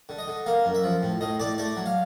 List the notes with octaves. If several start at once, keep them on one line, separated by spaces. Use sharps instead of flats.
D3
D#5
D3
A#3 F5
F#2
E5
F3
A2
A2 D#5
A2 D5
A3 D5
F#3
F5